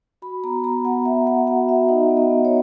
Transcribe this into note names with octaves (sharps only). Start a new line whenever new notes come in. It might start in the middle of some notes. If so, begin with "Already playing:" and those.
F#4 B5
B3 A#5
B3 A#5
B3 F#5
B3 E5
B3 F#5
F#4 F#5
F#4 E5
D#4 D#5
B3
D#5
B3
C#5